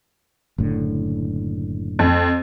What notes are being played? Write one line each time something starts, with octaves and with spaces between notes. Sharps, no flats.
F#1 A2 D3
F2